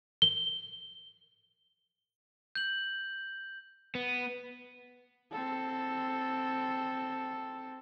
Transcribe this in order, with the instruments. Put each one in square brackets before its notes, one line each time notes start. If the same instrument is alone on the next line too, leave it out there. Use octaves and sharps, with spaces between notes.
[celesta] G7
[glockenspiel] G6 F#7
[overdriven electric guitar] B3
[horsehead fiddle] C4 A4